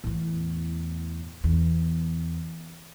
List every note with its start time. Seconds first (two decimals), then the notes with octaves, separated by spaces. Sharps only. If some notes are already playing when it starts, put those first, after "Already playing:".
0.04 E2 A2
1.44 E2